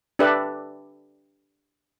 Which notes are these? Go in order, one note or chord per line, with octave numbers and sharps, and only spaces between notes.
D4 G4 A4 B4 D5 E5